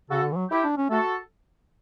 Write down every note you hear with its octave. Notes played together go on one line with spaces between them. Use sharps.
C#3 F#4 A4
D3
E3
F#3
E4 G4
D4
C#4
A3 F#4 A4